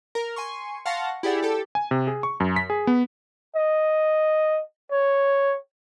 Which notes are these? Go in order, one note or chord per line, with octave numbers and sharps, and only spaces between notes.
A#4
G#5 C6 C#6
F5 F#5 A5 C6 C#6 A#6
E4 G4 G#4 D5 F#5
G4 A4
G#5
C3
G#4
C#6
F#2
B6
G#4
B3
D#5
C#5